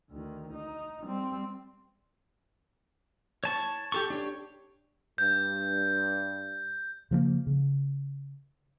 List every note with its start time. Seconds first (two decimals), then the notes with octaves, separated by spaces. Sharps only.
0.10 D2 D#3
0.53 D#4
1.04 G3 C4
3.44 C#5 A5 C#6
3.92 G4 A4 C#6
4.10 D4 G4 C#5
5.18 G2 G6
7.11 C#3 F3 G#3 A#3
7.47 C#3